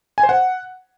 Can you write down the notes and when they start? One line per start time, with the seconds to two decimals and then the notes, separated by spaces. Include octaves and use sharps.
0.18 G#5
0.23 C5
0.29 F#5